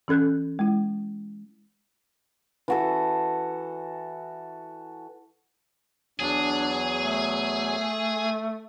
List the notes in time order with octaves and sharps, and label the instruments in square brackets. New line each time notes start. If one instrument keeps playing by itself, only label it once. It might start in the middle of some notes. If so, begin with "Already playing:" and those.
[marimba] E3 C#4 A4 F#6 G6
G#3 E4
[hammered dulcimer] E3 F#4 A4
[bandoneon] E2 F#3 [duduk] D4 [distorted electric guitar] G#4
[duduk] A3